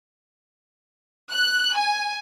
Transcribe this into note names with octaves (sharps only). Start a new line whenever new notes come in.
F#6
G#5